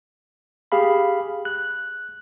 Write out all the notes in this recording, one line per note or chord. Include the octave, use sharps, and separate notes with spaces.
G4 G#4 F5 B5
F#6